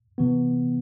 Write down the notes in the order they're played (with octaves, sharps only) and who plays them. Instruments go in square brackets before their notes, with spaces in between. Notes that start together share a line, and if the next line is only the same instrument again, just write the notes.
[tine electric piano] C3 E3 B3